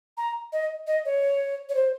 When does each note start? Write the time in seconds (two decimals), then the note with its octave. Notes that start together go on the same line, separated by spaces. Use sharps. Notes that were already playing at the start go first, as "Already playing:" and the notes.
0.17 A#5
0.53 D#5
0.87 D#5
1.05 C#5
1.69 C#5
1.75 C5